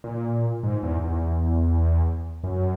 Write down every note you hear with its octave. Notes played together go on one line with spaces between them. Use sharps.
A#2
G#2
E2
E2
F#2